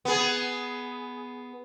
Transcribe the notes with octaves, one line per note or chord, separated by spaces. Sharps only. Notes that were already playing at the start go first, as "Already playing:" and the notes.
B3 G#4